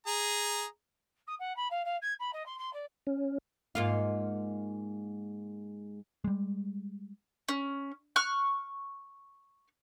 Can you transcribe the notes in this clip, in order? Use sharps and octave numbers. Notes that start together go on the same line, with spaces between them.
G#4 A#5
D#6
F#5
B5
F5
F5
G#6
B5
D#5
C6
C6
D5
C#4
G#2 A#3 F4
G3 G#3
C#4
C#6 F6 F#6